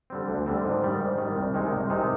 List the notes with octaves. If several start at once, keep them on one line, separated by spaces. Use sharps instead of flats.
D3 G3 C4
D2
D3 G3 C4
G#2
D#3 G3
G#2
D#3 G3
C2
C3 D#3 G#3 D#4
C2
C3 D#3 G#3 D#4